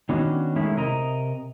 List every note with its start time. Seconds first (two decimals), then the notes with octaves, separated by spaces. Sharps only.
0.09 D#3 B3 C#4 D4 F#4
0.56 D#3 G#3 A3 C#4 E4
0.77 C3 A#4 D#5 A#5